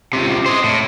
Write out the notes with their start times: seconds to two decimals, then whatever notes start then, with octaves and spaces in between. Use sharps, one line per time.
0.13 C#2 C3
0.46 C5 D#5
0.64 A2